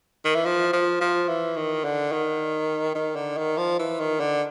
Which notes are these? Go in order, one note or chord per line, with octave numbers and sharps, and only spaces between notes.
D#3
E3
F3
F3
F3
E3
D#3
D3
D#3
D#3
D3
D#3
F3
E3
D#3
D3